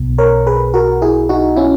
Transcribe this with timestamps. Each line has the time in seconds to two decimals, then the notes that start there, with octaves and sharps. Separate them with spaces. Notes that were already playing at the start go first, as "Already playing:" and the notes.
Already playing: B1 B2
0.18 A#4 C#5
0.46 G#4 B4
0.74 F#4 A#4
1.02 E4 G#4
1.29 D#4 F#4
1.56 C#4 E4